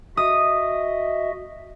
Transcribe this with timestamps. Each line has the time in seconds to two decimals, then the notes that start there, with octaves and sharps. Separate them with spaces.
0.17 F#4 D#5 E5 D#6